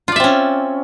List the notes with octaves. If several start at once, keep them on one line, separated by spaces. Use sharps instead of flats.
C4 C#4 F4 D5 E5